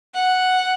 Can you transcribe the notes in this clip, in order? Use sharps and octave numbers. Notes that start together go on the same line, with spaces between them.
F#5